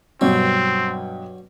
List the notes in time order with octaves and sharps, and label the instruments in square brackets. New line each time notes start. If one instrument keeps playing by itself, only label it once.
[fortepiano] G2 B2 [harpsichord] F#3 [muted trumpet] C4